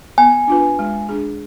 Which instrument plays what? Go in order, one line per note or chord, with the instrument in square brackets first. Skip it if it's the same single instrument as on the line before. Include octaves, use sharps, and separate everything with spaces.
[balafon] B3 [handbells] G#5
[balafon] D4 F4 B4
G#3
D4 G#4